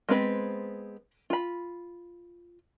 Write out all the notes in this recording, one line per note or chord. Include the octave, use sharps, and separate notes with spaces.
G#3 B3 C4 B4
F4 B5